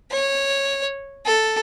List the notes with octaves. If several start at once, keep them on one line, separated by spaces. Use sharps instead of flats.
C#5
A4